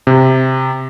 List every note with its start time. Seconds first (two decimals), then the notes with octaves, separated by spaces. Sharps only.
0.07 C3